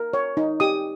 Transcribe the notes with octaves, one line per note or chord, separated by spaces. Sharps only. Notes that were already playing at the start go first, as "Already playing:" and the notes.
Already playing: A#4
C#5
D#4
G4 D#6